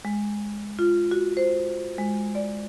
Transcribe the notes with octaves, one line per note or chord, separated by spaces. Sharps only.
G#3
F4
F#4
C5
G#3
D5